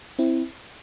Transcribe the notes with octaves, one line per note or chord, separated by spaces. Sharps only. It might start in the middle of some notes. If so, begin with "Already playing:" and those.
C4 E4